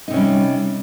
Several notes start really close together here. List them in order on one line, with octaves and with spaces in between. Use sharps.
D#4 C3 C#4 G3